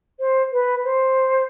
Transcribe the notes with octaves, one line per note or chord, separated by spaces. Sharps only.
C5
B4
C5